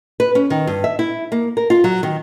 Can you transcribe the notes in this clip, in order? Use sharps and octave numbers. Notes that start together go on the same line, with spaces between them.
B4
C#4
D#3
G2
E5
E4
A#3
A#4
F4
F#3
D#3